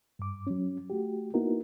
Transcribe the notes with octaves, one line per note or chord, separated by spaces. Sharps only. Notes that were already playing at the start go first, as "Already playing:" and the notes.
G2 D6
F#3 C#4
A3 F#4 G4
A#3 B3 D#4 E4 F#4 A#4